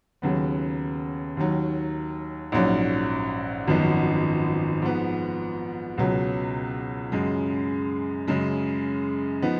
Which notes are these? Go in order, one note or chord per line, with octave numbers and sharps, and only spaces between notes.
D#2 C#3 F#3 B3
D#2 D#3 F#3
A#1 G#2 F#3 C#4
G#1 F#2 F3 B3 D#4
G#2 F3 B3
C#2 B2 F#3 C#4
F#2 C#3 G#3
F#2 C#3 G#3
F3 B3 D#4